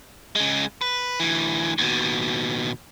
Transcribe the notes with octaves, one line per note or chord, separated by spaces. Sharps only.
C#3 G#3
B4
D2 E3
D#2 B2